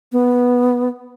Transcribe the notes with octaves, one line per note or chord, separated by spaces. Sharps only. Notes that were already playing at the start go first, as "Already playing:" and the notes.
B3